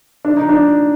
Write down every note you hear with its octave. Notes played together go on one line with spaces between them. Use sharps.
D4
D#4
D4